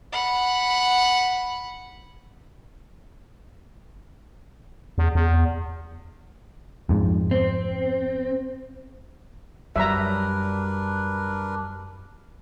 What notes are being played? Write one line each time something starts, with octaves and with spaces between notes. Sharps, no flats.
F#5 B5
E2
E2
F2 G#2
C4
F#2 F#3 G3 D4 A#4 B4 E5 A#5